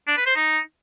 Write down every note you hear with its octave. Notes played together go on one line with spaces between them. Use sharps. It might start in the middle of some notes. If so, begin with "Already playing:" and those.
D4
B4
C5
D#4